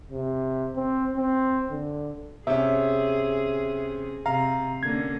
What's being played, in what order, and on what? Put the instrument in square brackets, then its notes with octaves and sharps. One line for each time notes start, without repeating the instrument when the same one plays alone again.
[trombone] C3
C4
C4
D3
[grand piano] C3 C#4 [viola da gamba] G#4 [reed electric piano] E5
[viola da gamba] C3 [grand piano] F5 [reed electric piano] A#5
[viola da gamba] D3 A#3 C#4 [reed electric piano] G#6